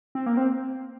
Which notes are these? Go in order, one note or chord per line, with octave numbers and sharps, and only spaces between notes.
C4
A#3
C4